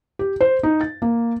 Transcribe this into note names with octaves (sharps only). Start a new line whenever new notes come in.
G4
C5
D#4
A6
A#3